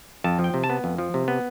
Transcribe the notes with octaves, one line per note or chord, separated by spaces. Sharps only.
F2 A5
F3
G5
C3
A5
B3
F2
F3
C3
B3